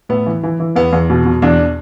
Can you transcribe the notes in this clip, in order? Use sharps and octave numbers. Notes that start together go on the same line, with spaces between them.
A2 B3
E3
E3
E3
E2 B3
E2
B2
B2
E2 D4